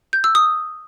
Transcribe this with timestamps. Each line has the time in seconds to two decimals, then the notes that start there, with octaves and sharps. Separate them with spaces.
0.13 G6
0.24 E6
0.35 D#6